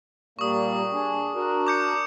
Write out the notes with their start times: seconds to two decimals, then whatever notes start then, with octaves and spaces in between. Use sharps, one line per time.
0.39 A#2 G3 A#3 C#6 D#6
0.93 D4 G#4
1.35 D4 F#4 A#4
1.67 D6 G6 C#7